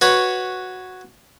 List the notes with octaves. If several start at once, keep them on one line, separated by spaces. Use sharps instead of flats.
F#4 B4 C#5